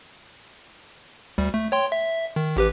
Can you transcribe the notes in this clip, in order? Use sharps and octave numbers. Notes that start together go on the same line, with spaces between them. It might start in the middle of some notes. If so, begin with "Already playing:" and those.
D2 G3
A3
C#5 G5 C6
E5
D#3
A1 G4 B4